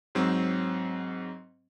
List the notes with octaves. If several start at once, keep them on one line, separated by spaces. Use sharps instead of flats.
G#2 F#3 C4